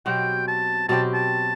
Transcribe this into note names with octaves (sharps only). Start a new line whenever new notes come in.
B2 F#3 C4 G4 G5
A5
B2 F#3 C4 G4 A5
A5